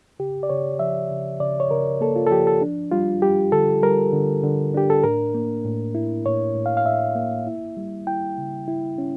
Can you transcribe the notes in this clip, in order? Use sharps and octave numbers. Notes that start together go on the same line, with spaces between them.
C#3 G4
D5
C#3 C#5
F3 E5
C#3
C#3 D5
C#5
C#3 A#4
A#3 A4
F4
A4
F3 G4
A4
D4
G3 F4
G3 G4
D3 A4
G3 A#4
D3
D3
D4 G4
A4
A2 A#4
A#3
A2
E4
A2 C#5
A2
F5
F5
A2 E5
A#3
E4
G3
E4 G5
C#3
E4
C#4